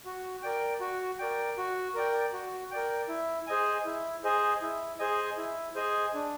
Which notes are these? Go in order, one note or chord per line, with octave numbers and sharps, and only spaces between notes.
F#4
A#4 D5 G5
F#4
A#4 D5 G5
F#4
A#4 D5 G5
F#4
A#4 D5 G5
E4
G#4 C5 D#5 G#5
E4
G#4 C5 D#5 G#5
E4
G#4 C5 D#5 G#5
E4
G#4 C5 D#5 G#5
D4